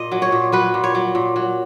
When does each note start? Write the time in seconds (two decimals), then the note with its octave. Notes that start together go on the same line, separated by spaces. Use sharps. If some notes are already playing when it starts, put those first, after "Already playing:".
Already playing: A#2 D#5
0.12 F#3
0.22 C#5
0.32 A#2
0.52 F#3 B4
0.74 A#2
0.84 C#5
0.95 F#3
1.15 A#2
1.36 F#3